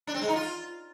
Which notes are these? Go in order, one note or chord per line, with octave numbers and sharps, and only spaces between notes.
D4
C4
G#3
D#4
F4